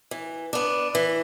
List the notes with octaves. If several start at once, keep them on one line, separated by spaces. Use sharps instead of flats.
E3
B3 D4
E3